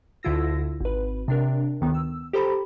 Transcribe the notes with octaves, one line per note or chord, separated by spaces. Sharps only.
D2 D3 E4 F4 E6 A#6
G#1 B4
C3 D4 A#4
D2 D#3 B3
E6
G4 A4 C5 A#5 B5